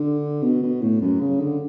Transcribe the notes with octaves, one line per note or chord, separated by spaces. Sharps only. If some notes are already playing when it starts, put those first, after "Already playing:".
Already playing: D3
B2
B2
A2
F#2
C#3
D3